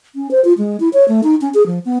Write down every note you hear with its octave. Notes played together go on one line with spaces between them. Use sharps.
C#4
C5
F4
G#3
E4
C#5
A3
D#4
C#4
G#4
F3
B3